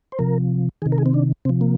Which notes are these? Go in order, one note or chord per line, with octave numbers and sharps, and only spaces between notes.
C5
C3 F3 A#4
C3 D#3 G#4
A#4
G#4
C4
D4
C3 F3 C4
A#3